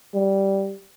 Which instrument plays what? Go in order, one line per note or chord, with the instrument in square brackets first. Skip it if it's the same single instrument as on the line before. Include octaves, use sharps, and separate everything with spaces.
[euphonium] G3